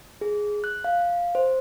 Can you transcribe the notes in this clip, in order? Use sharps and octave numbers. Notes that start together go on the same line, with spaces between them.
G#4
F#6
F5
C5